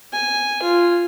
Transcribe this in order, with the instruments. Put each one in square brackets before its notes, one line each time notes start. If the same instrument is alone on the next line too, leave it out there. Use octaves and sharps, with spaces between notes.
[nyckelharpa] G#5
F4